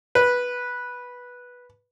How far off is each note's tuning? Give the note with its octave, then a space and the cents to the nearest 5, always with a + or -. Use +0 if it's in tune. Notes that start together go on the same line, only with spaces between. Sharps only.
B4 -10